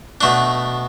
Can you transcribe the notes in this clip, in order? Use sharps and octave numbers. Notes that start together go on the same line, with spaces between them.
B2 A3 D4